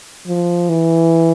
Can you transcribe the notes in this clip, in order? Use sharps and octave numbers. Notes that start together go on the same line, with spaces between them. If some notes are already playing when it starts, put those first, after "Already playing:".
F3
E3